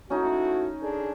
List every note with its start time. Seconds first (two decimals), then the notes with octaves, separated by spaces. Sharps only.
0.10 A3 C#4 D#4 E4 F#4
0.82 D4 G#4 A4